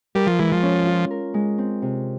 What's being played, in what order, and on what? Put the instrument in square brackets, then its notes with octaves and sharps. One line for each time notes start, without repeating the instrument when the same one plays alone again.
[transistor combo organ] G3 [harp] A#4
[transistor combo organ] F3
[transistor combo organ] E3 [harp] G#3
[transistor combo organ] F3
[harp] C#4
F4
A#4
G#3
C4
C3